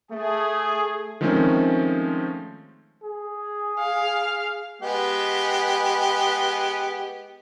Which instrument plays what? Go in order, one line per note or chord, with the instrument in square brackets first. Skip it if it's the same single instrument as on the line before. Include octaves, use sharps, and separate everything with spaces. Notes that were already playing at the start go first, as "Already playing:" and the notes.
[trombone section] A3 [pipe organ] G#4
[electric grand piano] D#3 F3 G#3 A3 C4 C#4
[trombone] G#4
[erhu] F5
[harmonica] G#3 B3 G4